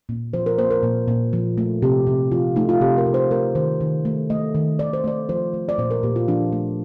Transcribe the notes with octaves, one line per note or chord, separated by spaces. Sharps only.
A#2
F3 C5
A#4
A#3 C5
A#4
A#2
A#2
F3
A3
C3 G4
C3
F3 F4
A3 D#4
F4
C3 G4
A#4
C3
C5
A3 A#4
D#3 C5
D#3
A3
A3 D#5
D#3
D#3 D5
C5
A3 D5
F3 C5
A3
D5
A#2 C5
A#4
A#2 G4
F4
F3 D4
A3